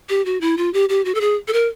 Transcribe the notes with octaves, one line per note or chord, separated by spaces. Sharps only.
G4
F#4
E4
F4
G4
G4
F#4
A4
G#4
A4
A#4